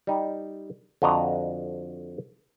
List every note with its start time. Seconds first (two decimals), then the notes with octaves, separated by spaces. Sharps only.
0.07 G3 D#4
1.02 F2 D3 F#4 D#5 A#5